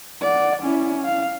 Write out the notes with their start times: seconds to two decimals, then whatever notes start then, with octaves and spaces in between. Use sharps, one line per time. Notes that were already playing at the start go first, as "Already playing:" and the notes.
0.21 D5 F#5
0.62 C#4 E4
1.05 F5